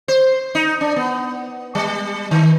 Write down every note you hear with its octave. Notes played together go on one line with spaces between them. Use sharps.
C5
D#4
D4
B3
G3
D#3